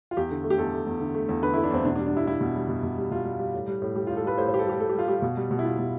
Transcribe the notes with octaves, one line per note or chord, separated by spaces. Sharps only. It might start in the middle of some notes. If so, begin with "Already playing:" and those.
F4
E2 G4
D3
A3
G4
E2 A4
A3
E2
D3
A3
E2
D3 B4
E4
A3
D4
E2 C4
B2 D4
D4
G3
D4
G3 E4
G3 E4
B2
G3
B2
B2
G3
B2 F4
G3
G3
A2
G3
A2
G3 G4
F4
A2
A4
G3 B4
A2 C5
C5
G3 G4
A4
G3 G4
G3 A4
G4
G3 F4
G3 G4
B2
G3
B2
E4
G3 F4
B2